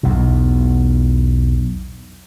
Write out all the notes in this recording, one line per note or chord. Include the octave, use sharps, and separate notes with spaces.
B1 E2 B2